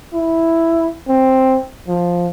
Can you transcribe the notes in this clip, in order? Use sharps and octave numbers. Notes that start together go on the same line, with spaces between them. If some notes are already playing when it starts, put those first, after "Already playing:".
E4
C4
F3